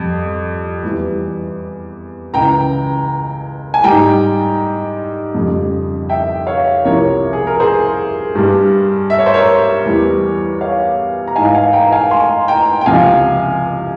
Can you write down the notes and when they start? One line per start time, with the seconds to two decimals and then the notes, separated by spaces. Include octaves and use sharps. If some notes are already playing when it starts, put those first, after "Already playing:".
Already playing: F2 G3
0.83 E2 E3 G3
2.33 C#2 C#3 E3 G5 A#5
3.74 G#5
3.84 G#2 G3 G5 A#5
5.34 F2 C#3 G3
6.09 E5 G5
6.47 C#5 F5
6.84 C2 C3 F3 A#4 C#5
7.33 G#4
7.47 A#4
7.60 G#4 C5
8.35 G2 G3
9.10 E5
9.18 C#5
9.26 C5
9.34 A#4 C#5
9.85 E2 E3 G3
10.61 C#5 F5
11.28 A#5
11.36 G#2 E3 G#3 F5 G#5
11.54 F5 G#5
11.73 G5 A#5
11.92 F5 G#5
12.11 G#5 C6
12.48 G5 A#5
12.81 G5
12.86 C#2 C3 F3 F5 G#5